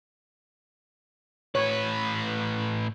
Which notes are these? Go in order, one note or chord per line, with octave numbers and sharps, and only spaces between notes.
A2 B4 C#5